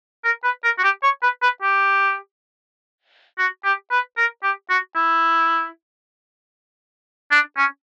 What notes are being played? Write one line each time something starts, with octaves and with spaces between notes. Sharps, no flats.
A#4
B4
A#4
F#4
G4
C#5
B4
B4
G4
F#4
G4
B4
A#4
G4
F#4
E4
D4
C#4